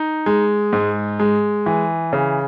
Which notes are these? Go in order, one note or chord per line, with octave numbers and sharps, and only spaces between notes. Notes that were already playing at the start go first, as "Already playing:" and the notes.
Already playing: D#4
G#3
G#2
G#3
E3
C#3